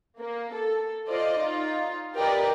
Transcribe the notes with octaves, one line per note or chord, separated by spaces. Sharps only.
A#3
A4
F4 C5 D5 D#5
D#4 F4
G4 A#4 B4 D5 D#5 G5